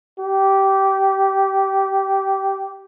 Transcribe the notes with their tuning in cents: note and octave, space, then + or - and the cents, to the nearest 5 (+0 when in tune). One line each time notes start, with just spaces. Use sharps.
G4 -15